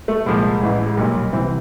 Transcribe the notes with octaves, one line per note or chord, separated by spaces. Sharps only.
A3
C2 A#2 F3 G#3
A1 A2 E3
G#3
B1 A#2 F#3 G3
C2 C3 E3 C4